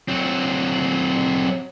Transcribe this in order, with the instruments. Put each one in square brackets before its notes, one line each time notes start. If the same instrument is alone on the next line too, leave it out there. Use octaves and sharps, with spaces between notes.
[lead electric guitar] F#3 C4